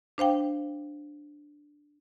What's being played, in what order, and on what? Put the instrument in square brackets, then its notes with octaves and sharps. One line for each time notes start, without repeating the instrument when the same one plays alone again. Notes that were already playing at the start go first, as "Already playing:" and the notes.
[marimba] D4 C5 F5 G5